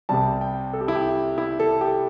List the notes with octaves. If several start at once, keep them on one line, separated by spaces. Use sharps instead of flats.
C2 C3 G3 A5
G5
A4
G4
E4
G4
E4
A4
G4